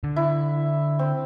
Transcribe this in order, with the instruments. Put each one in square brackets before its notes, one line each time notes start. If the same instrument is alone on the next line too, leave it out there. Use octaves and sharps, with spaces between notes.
[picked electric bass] D3
[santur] E4
C4